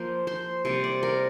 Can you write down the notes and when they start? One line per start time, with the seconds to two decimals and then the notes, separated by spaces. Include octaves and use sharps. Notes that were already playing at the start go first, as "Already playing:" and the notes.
Already playing: F3 A#3 C5
0.27 C5
0.65 C3 G3 A#3 C5
0.84 D5
1.03 A#4